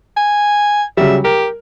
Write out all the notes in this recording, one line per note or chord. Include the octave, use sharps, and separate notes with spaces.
G#5
C#3 F#3 G3 E5
G4 A#4